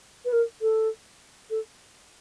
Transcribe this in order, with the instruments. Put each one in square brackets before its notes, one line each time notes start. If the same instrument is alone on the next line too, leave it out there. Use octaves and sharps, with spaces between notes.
[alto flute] B4
A#4
A4
A4